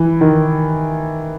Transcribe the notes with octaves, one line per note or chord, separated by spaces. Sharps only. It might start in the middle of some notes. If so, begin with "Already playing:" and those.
Already playing: E3
D#3